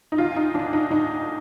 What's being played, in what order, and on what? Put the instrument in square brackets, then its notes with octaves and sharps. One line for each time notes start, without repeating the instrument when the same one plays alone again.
[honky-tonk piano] D#4
D2 F4
D#4
D2 D4
D#4
D2 D#4